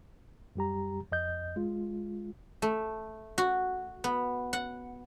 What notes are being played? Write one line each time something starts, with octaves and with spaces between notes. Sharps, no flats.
F#2 G3 G4 A#5
F2 D#5 G6
G#3 F4
A3
F#4
B3
F#5